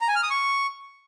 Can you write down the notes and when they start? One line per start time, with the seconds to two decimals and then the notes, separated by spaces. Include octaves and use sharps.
0.01 A#5
0.08 G#5
0.15 F6
0.23 D#6
0.30 C#6